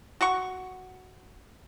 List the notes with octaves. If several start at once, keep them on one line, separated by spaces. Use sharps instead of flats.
F#4 F#5 C#6